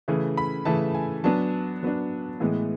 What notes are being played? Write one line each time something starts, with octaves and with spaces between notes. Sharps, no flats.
C#3 E3 A3
B5
C#3 E3 A3 A5
G#5
F#3 B3 D4 A5
F#3 B3 D4
A2 E3 G#3 B3